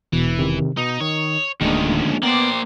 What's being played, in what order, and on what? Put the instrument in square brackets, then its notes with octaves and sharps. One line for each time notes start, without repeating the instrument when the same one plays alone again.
[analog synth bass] E1 [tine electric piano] B2 [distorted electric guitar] E3
[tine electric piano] C3 D#3
[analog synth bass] B2 [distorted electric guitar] D#4 [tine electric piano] D#6
[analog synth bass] D#3 [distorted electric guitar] C#5
[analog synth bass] D1 [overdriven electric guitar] D2 D#3 [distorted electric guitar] F3 C#4 [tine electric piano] G#3 A#3 D4
[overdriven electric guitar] A#3 C5 [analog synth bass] B3 [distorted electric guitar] D5 [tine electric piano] G5 D6